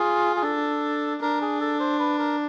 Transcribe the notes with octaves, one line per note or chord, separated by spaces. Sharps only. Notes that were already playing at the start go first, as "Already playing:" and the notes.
Already playing: F4 G#4
G#4
D4 A4
D4 A#4
G#4
A4
C5
B4
A#4